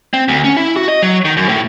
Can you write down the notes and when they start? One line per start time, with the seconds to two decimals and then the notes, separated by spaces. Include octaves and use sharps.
0.14 C4
0.28 D2
0.44 C#4
0.57 E4
0.77 F#4
0.88 D#5
1.02 F#3
1.25 D#3
1.37 F#2
1.49 A2